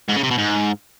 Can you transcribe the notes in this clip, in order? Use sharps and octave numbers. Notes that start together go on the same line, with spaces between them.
G#2
C#3
C3
B2
G#2